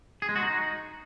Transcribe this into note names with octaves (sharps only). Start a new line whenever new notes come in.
G#4
G#3
F#4
D#4